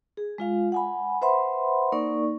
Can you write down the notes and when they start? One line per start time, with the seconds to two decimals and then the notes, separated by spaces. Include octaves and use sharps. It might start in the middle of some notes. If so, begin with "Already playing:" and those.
0.17 G#4
0.38 G#3 F4 F5
0.72 F#5 G#5 B5
1.21 B4 C5 E5 F#5 B5 C6
1.92 A#3 D#4 A#4 D5 C#6